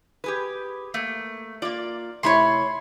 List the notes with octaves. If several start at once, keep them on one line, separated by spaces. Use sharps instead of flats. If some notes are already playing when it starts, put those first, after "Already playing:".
G4 G#4 B4
A3 A#3
A#3 F4 D5
C3 A3 E4 C#5 B5 C6